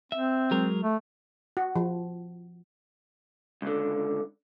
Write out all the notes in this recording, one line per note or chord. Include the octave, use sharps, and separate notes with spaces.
C4 E5
F#3 G#3 A#4
A3
F#4
F3
C#2 D3